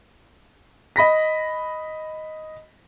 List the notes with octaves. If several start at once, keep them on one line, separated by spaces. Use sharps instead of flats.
D#5 B5 A#6 B6